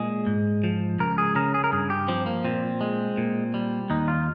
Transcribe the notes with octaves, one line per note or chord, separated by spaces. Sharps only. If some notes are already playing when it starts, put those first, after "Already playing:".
Already playing: A#2 G#3 G#4
G#2
F3
C#2 A#4
G#4
C#3 A#4
G#4
A#4
G2 G#4
G4
F3 C4
A#3
A#2 C4
G#3
A#2
G3
D#2 D#4
F4